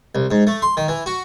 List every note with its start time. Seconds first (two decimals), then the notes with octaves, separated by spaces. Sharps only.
0.15 C2
0.31 G#2
0.47 A3
0.62 C6
0.77 D#3
0.88 E3
1.06 F#4